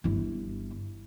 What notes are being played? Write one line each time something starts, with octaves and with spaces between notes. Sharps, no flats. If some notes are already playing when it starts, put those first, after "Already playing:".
G1 E4